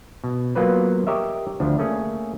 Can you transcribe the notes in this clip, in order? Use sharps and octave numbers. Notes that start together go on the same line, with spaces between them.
B2
F#3 A#3 B3 F4 B4 C5
G4 A#4 C#5 D#5 E5
D2 F3 D4
A3 A#3 C#4 G#4